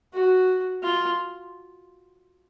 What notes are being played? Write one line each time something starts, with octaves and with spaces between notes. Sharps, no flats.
F#4
F4